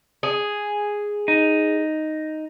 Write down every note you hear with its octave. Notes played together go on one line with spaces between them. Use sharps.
G#4
D#4